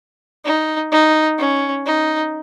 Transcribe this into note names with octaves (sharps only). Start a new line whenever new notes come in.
D#4
D#4
C#4
D#4